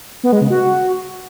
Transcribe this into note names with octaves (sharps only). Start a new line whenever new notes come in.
B3
G#3
C#3
F#4